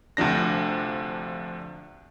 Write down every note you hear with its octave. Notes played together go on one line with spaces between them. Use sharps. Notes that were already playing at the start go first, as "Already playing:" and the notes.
D2 C3 F3 D4 A#6